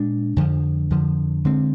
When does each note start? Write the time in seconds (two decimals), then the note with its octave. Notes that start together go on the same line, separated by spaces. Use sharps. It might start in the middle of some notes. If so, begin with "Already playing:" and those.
Already playing: A#2 G#3 D4
0.37 F2 D3 F3
0.90 F2 D3 F3
1.45 D3 G#3 C4